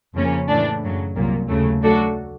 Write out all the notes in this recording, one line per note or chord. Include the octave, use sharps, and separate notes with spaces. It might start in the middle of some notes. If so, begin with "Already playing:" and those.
F2 C#3 F3 A#3 C#4
A2 E3 A3 D4
F#2 C#3 F#3
C2 A#2 F#3 A#3
D#2 C#3 F#3 A3
F#3 A3 D4 F#4 A4